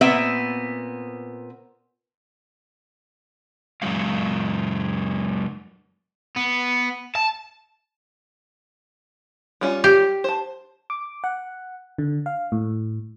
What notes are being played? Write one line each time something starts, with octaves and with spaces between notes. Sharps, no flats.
A#2 B3 C4 E5
F#2 C#3 F#3 G#3 F5
B3
A5
G3 C#4 F4
G4
C5 A5
D6
F#5
D3
F5
A2